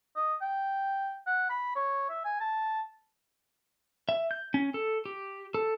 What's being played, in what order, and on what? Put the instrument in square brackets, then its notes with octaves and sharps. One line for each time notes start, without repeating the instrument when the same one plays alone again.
[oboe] D#5
G5
F#5
B5
C#5
E5
G#5
A5
[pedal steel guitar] E5
G6
C#4
A4
G4
A4